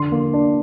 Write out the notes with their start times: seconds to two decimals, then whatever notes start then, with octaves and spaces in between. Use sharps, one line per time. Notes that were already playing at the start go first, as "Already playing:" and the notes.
Already playing: D3 C6
0.12 A#3
0.33 D4